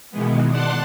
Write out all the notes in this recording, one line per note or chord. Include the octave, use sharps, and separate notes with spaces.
B2 D#3 E3 G#3 B3
D5 F#5 A5 C6 F#6